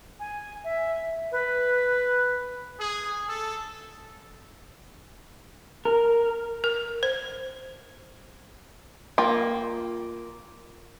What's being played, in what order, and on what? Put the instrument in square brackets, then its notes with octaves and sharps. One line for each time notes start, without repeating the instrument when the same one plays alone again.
[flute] G#5
E5
B4
[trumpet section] G#4
A4
[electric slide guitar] A#4
[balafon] A#4
C5
[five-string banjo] A#3 F4 G5